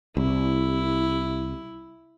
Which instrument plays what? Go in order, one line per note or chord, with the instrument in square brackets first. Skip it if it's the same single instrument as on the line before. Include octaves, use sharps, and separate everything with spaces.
[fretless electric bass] C2 [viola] E4